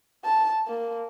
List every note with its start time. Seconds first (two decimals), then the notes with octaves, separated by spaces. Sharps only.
0.25 A5
0.68 A#3